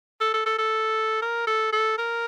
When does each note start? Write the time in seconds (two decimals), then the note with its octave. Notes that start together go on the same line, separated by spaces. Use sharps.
0.21 A4
0.34 A4
0.46 A4
0.58 A4
1.22 A#4
1.47 A4
1.73 A4
1.98 A#4